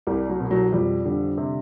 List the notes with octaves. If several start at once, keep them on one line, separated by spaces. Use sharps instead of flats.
C2 G3
F#3
B2
F#3
F2 G3
D3 G3
C3